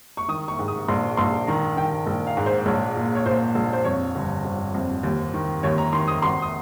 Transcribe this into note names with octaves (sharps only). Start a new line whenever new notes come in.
C#6
D#3 D#6
C#6
G#2
D#6
A#1 C6
A#1 C6
D#3 A#5
D#3 G5
A#1
F5
G#2
C5
A#1 C#5
A#2
C#5
A#2 C5
A#1
C5
F2 C#5
G1
G1
F2
D#2
D#3
D#2 C#5
A#5
D#3 C6
D#6
G#1 C6
D#6